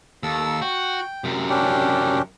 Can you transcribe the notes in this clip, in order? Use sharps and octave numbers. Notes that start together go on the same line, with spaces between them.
D#2 A4 E6
F#4 G5
F#2 C3
C#4 D4 G4